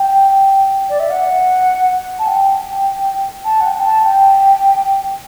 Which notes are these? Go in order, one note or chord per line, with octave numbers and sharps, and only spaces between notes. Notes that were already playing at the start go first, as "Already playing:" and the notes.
Already playing: G5
D5
E5
F#5
A5
G5
A5
F#5
G5
A5
G5